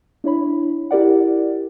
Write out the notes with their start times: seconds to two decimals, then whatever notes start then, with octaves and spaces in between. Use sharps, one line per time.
0.24 D4 E4 C#5 B5
0.91 E4 G4 A#4 D5 F#5